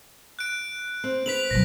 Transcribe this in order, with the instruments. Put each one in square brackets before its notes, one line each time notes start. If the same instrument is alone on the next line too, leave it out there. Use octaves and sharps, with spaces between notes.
[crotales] F#6 D7
[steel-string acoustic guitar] C4
[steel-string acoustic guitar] C4 B4 [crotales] B6 F7 F#7
[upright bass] B2 F#3 [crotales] A#6